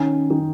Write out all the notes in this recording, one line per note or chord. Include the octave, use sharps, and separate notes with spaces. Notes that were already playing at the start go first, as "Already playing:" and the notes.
Already playing: D#3 C#4
D#3